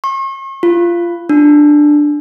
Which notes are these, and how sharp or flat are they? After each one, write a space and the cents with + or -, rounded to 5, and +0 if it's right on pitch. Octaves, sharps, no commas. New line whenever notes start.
C#6 -45
F4 -20
D4 +10